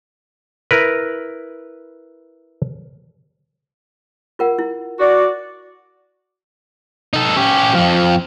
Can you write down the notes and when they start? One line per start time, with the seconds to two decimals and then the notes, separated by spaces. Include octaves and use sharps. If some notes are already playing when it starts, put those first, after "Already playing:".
0.71 E4 A#4 B4
4.39 F4 A#4 F#5
4.59 E4
4.99 F#4 D5
7.13 D#4 A4
7.36 C#4 G4
7.74 F2 F3